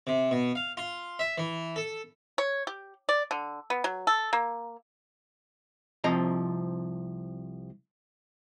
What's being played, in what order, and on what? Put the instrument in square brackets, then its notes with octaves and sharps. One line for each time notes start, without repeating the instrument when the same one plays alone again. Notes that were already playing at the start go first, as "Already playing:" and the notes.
[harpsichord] C3
B2
F5
F4
E5
E3
A4
[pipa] C#5
G4
D5
D3
B3
F#3
A4
A#3
[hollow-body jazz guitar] C2 F3 C4 D#5 A#5